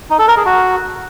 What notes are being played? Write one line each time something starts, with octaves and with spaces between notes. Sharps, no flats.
D#4
A4
A#4
G#4
F#4